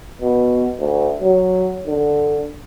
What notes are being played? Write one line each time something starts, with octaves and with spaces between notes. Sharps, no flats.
B2
D2
F#3
D3